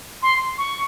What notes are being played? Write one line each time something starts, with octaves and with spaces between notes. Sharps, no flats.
C6
C#6